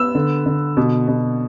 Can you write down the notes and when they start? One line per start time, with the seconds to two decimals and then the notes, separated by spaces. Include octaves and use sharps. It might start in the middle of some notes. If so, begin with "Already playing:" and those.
Already playing: B3 E6
0.15 D3
0.46 D3
0.77 B2
1.08 B2